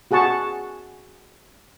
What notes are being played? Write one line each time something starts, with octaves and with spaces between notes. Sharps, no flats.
F#4 G#4 F#5 A5 C#6